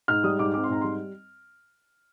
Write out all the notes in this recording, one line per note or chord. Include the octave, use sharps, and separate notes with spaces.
G#2 F6
G3 D#6
G#2 D6
C4 D6
C6
G#2 A#5
G3 C6